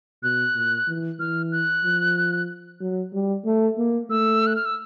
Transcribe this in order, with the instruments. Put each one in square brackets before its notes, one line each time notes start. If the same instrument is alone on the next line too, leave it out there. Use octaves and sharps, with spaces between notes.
[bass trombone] B2 [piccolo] F#6
[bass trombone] A#2
E3
[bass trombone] E3 [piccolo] F6
[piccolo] F#6
[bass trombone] F3
F#3
G3
A3
A#3
[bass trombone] A3 [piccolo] E6
[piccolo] F#6
F6
E6